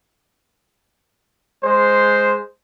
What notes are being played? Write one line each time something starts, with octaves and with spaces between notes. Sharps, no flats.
G#3 C5